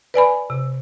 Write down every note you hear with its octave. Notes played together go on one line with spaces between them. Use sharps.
B4 D5 G#5 B5
C3